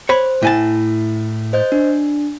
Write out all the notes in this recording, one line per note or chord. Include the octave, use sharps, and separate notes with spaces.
C5 C#5 B5
A2 E4 G#5 A5
C5 D#5 G6
D4